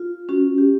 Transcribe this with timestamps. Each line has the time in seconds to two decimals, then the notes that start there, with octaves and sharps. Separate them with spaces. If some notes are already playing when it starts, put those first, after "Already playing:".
Already playing: F4
0.29 C#4 F#4
0.58 G4